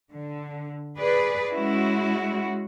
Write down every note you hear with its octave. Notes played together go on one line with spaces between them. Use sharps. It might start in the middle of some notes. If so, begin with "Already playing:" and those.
D3
G#4 B4 D5
G#3 C#4 E4 F#4